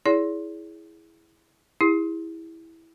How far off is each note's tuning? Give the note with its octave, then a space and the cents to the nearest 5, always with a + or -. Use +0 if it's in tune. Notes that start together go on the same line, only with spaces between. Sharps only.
E4 +0 G#4 +5 D5 -45
E4 -5 G#4 -45